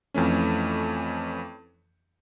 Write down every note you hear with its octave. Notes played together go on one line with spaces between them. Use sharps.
F2 E3 A3 C#4